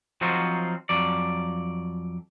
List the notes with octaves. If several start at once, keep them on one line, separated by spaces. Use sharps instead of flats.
F3 F#3 C4 D#4 F4 F#4
F2 F#3 D5